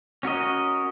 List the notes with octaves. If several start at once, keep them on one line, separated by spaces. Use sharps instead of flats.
C#4 F#4 A#4 D#5